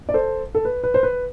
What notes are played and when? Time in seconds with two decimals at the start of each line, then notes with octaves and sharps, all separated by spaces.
0.09 D5
0.14 A4 C5
0.55 A4
0.65 B4
0.83 B4
0.94 C5
1.03 B4